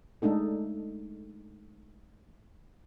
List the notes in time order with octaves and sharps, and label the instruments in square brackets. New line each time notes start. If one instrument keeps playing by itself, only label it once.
[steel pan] G#3 A3 D4 D#4 A4